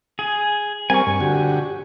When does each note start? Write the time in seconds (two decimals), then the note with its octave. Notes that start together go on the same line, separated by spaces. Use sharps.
0.19 G#4
0.90 G3 C4 A#4 G#5 C#6
1.07 G2
1.20 D3 F#4 G4